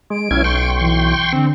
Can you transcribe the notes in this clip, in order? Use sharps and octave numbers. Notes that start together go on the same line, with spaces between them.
G#3 D7
B1 C#4 E4 G#6
G5 C6 C#6
E3
D3 C4